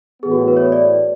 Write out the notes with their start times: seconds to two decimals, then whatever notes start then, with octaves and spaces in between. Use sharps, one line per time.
0.23 A2 E3 B3 G#4
0.31 F#4
0.48 B4
0.57 C#5
0.72 D5